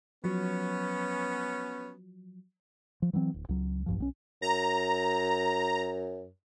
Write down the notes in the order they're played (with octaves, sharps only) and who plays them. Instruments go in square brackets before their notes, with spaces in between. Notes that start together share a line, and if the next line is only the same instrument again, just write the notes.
[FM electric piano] F3 F#3 [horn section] B3 C#4
[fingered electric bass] F3
E3 F#3 G3 C4
D1
C#2 F#3
B1 G2 F3
B1 F#3 C#4
[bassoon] F#2 [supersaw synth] A#5